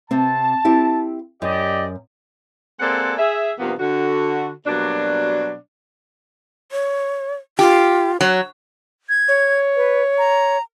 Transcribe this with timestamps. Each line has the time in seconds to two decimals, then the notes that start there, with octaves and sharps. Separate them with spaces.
0.11 C3 C4 A5
0.65 C4 E4 G4
1.42 F#2 G4 D5 D#5
2.80 G#3 A#3 C4 A4 D5 F#5
3.18 G#4 E5
3.59 G2 C3 F3 A#3 B3
3.79 D3 F#4
4.66 B2 F#3 G3 A#3 D4
6.72 C#5
7.59 F4 G4
8.21 F#3 C#5
9.09 G#6
9.28 C#5
9.76 B4
10.18 A#5